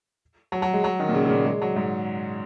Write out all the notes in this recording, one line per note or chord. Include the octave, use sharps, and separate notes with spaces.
F#3
F#3
G#3
F#3
D#3
A#2
C#3
C#3
A#2
G#3
F#3
G#2